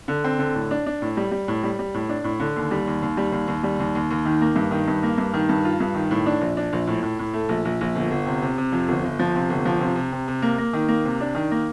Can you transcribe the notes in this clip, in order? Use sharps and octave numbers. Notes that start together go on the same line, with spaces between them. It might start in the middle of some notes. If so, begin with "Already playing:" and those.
D3
C4
D3
A2
D4
D4
A2
G3
G3
A2
G3
G3
A2
D4
A2
D3
D#2
G3
D#2
D#2
G3
D#2
D#2
G3
D#2
D#2
D#2
D#3
A#3
G2
D#3
G2
A#3
G2
D#3
G2
F4
G2
D#3
A2
D4
A#1
D4
A#1
A2
A2
A2
A3
A#1
A#1
A#1
G1
G1
C3
C3
C3
F2
G1
G1
F3
C3
G1
F3
C3
C3
C3
C3
A#3
A#3
D#3
A#3
C3
D4
D#3
A#3